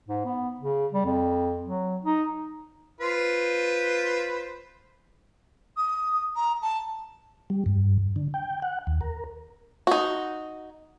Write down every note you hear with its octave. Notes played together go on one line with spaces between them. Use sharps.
G#2
B3
C#3
G3
F2
F#3
D#4
F4 B4 C5
D#6
A#5
A5
G3
G2
D3
G5
F#5
D#2
A#4
D#4 F#4